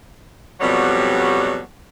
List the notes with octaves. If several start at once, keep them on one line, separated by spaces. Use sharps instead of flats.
F2 B2 F#3 G3